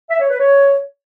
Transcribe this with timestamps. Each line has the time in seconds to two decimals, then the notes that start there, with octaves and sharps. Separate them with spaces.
0.10 E5
0.20 C#5
0.30 B4
0.40 C#5